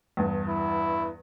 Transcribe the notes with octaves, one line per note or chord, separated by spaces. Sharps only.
E2 G2
E4